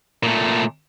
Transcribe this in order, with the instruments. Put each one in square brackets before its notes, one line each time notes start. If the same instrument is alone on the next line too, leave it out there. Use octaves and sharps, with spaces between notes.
[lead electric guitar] A#2 A3